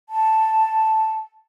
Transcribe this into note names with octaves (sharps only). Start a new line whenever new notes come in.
A5